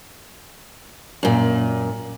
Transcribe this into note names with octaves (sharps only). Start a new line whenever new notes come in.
F#2 A#2